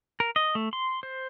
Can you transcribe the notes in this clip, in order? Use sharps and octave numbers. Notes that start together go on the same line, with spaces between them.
A#4
D#5
A3
C6
C5